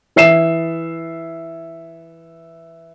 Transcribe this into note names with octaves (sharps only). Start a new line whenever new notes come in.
E3 E5 C7 E7